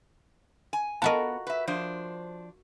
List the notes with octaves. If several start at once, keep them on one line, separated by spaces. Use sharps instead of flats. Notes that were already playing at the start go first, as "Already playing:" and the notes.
G#5
B3 F4 F#4 A#4 D#5 A5
B4 E5
F3 D4 C5